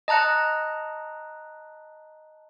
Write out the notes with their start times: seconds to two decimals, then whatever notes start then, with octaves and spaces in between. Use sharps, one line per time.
0.08 D#5 A5 A#5 F#6 C#7